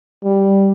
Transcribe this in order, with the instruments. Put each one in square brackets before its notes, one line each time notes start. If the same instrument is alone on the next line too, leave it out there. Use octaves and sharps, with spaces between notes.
[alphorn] G3